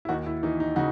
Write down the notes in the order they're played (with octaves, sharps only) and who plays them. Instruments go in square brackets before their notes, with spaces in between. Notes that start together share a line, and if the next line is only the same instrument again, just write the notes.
[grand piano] E4
D#2 D#4 F#4
E4
E3 D#4
D#4
C#3 D#4 F#4